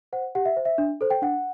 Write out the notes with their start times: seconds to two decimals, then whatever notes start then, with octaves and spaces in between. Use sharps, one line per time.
0.13 C5 F#5
0.35 G4 F#5
0.45 E5
0.56 C5
0.65 E5
0.78 D4
1.01 A4 C5
1.10 G5
1.22 D4 F#5